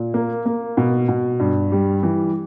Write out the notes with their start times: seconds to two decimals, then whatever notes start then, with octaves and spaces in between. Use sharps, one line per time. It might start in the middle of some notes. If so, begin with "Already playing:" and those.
Already playing: A#2
0.14 A#3
0.46 A#3
0.77 B2
1.08 B2
1.40 G2
1.72 G3
2.03 E3